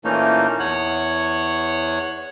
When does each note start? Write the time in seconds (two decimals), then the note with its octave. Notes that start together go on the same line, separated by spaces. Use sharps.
0.04 A#2 E3 A3 A#3 C#4 D#4
0.59 E2 C#5 F#5